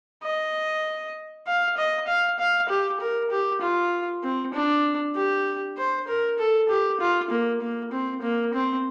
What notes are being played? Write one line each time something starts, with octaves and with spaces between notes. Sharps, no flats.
D#5
F5
D#5
F5
F5
G4
A#4
G4
F4
C4
D4
G4
C5
A#4
A4
G4
F4
A#3
A#3
C4
A#3
C4